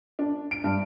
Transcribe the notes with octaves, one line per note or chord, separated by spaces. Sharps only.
D4
D7
G2